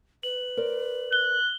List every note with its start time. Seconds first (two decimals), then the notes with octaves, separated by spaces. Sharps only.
0.23 B4 F#7
0.57 A#4 C5 D5
1.13 F#6 G7